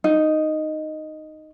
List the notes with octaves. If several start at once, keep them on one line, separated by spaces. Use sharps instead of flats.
D#4